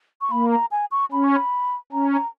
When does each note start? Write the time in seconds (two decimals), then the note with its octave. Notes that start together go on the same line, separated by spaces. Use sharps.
0.21 C#6
0.31 A#3 B5
0.52 A#5
0.71 G#5
0.91 C#6
1.12 C#4 B5
1.24 C#6
1.36 B5
1.92 C#4 A#5
2.13 A#5